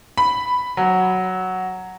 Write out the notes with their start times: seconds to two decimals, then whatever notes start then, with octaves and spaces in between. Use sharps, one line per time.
0.18 B5
0.77 F#3